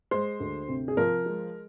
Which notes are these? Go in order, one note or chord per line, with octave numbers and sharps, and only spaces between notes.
G#3 C5
D2
C3
G#4
F3 A#4
G#3